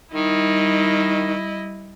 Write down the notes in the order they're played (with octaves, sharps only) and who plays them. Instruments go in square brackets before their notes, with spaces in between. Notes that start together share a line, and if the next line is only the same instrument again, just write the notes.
[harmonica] D#3 [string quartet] G3 E4 D#5